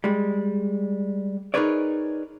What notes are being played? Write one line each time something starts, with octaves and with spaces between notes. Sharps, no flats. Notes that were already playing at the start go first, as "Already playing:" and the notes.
G3 G#3
D#4 G#4 A#4 B4 C#5 D5